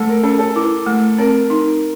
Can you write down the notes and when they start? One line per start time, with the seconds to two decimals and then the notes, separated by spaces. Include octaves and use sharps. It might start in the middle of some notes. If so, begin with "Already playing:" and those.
Already playing: A3 A4
0.09 A#4
0.23 C#4 A4
0.39 A4
0.56 E4
0.86 A3
1.18 C4 A#4
1.50 D#4